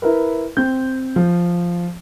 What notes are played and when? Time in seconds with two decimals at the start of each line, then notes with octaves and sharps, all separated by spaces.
0.02 E4 A#4 B4
0.57 C4 G6
1.16 F3